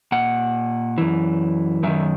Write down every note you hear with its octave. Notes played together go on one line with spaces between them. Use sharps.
A#2 F#5
F#2 E3
F#2 D#3 E5